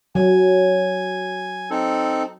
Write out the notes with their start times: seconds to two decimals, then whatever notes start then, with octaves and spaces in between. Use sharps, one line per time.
0.15 F#3 G#5
1.70 C4 D#4 A4